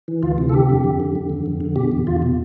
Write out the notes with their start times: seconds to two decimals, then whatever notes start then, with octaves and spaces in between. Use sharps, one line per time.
0.08 E3
0.23 D2 F4
0.38 C3
0.49 A4
0.53 D3 G4
0.69 F2
0.84 F2
1.00 D3
1.15 D3
1.29 F2
1.46 F2
1.61 D3
1.76 B2 G4
1.92 E2
2.07 E2 F4
2.22 B2